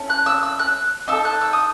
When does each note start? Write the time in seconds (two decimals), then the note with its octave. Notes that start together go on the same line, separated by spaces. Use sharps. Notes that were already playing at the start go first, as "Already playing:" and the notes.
Already playing: C#4 E4 A4
0.10 F#6
0.26 E6
0.43 E6
0.59 F#6
1.08 D#4 A4 E6
1.25 F#6
1.41 E6
1.53 D#6